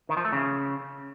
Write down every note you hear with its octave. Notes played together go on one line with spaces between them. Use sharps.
D#3
F3
A3
C#3